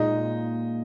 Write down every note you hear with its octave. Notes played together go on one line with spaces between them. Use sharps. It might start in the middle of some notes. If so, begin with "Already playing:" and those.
Already playing: A#2 G#3 D#4 D#5